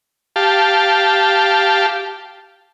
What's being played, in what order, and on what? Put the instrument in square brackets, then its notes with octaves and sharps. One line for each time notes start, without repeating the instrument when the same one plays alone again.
[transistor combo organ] G4 F5 A5